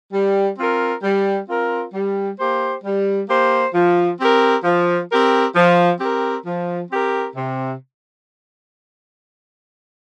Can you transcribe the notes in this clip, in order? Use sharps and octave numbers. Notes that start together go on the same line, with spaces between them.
G3
C4 F4 A#4
G3
C4 F4 A#4
G3
A#3 G4 C5
G3
A#3 G4 C5
F3
C4 G4 A#4
F3
C4 G4 A#4
F3
C4 G4 A#4
F3
C4 G4 A#4
C3